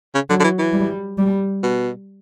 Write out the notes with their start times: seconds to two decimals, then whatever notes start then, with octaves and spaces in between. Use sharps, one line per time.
0.15 C#3
0.29 D3 F#3
0.40 D3
0.44 E3
0.59 E3
0.73 G3
1.18 G3
1.63 B2